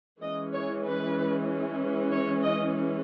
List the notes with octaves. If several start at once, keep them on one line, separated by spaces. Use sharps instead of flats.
E3 G#3 C#4 D#5
C#5
B4
C#5
D#5